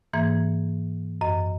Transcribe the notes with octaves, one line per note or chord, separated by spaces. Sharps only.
G#2 E3 A#3 G#6
F#2 D#5